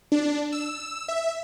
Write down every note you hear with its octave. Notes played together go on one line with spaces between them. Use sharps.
D4
E6
E5